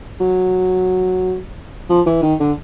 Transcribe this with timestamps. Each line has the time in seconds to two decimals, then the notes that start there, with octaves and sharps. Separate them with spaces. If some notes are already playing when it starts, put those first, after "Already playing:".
0.20 F#3
1.89 F3
2.06 E3
2.23 D#3
2.40 D3